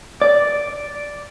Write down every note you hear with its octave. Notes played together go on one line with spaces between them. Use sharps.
D5